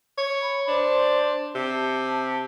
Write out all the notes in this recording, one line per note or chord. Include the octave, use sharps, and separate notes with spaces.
C#5
B5
D4 C5
C3 A5